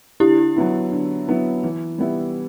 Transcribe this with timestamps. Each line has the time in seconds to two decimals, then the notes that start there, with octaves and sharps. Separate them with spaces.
0.20 D3 E4 G4
0.56 F#3 B3 E4
0.92 D3
1.28 F#3 B3 E4
1.64 E3
1.98 G3 B3 E4